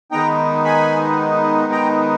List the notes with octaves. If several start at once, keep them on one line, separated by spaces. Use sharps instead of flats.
D#3 G#3 B3 D#4 G5 A#5
G#5 B5
G5 A#5